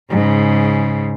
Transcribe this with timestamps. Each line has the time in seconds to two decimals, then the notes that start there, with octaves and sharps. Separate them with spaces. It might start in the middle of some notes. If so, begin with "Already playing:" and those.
0.10 G#2 C#3